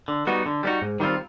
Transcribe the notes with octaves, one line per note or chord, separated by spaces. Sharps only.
D3
G3 B3 D#4 F#4
D3
G3 B3 D#4 F#4
G#2
D#3 G3 C4 F4